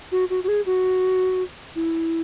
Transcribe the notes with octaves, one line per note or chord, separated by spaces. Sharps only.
F#4
F#4
F#4
G#4
F#4
E4